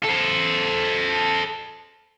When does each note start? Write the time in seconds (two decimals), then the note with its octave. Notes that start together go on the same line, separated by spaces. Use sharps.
0.05 A4 C5